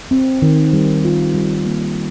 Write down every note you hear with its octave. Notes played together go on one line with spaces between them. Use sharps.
C4
D#3
G3
F4
G3
A#3